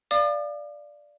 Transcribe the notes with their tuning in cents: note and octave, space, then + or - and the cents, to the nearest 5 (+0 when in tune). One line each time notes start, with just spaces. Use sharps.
D5 +0 F5 -15 D6 +45